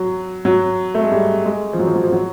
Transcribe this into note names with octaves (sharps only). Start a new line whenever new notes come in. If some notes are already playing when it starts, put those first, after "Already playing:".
Already playing: F#3
F#3
A3
G#3
G3
G#3
F3
F#3
F3
F#3
F3
F#3